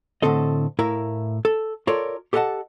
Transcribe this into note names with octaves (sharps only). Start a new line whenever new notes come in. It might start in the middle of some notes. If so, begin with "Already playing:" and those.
A2 D3 A#3 C4 A4 D#5
A2 E4 A#4 E5 F5
A4
F4 A4 A#4 C#5 D5
G4 A4 D#5 F5 F#5 A5